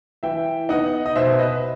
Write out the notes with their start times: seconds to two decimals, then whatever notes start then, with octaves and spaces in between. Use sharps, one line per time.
0.23 E3 E5 G5
0.69 B3 D#4 D#5 F#5
1.06 D#5
1.16 B2 C5 E5
1.39 B4 D#5